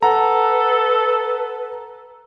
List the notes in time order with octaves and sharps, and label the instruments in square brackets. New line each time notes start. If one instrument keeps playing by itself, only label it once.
[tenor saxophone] A4 [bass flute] B4 [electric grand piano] F#5 A#5